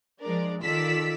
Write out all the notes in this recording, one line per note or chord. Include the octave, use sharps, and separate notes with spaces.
F3 G#3 D4 A#4 D5
D#3 F4 A4 D5 E6 B6